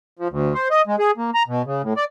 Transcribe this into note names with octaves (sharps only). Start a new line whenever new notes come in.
F3
D2
C5
D#5
G#3
G#4
A#3
A#5
B2
C#3
A2
D5